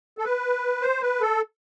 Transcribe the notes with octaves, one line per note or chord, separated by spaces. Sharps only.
A4
B4
C5
B4
A4